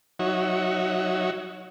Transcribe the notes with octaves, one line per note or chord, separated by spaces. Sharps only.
F#3 D#4 F#4 C#5 E5